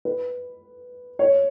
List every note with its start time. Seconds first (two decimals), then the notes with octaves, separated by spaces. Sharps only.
0.05 B4
1.19 C#5